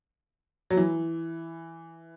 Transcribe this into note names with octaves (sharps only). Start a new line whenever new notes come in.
F#3
E3